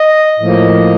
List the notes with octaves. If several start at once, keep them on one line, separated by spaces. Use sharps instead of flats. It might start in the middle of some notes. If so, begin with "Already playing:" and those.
Already playing: D#5
A2 F3 A#3